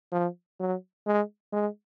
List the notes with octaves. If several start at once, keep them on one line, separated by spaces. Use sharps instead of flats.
F3
F#3
G#3
G#3